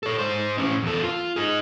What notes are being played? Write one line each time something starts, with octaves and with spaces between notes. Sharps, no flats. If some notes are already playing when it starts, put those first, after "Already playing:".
A4 C#5
G#2 C5
A2 C#4
E2 A4
F4
D#4 G#4